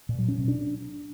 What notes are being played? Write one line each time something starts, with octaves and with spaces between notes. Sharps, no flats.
A#2
F#3
C#4
B2
D4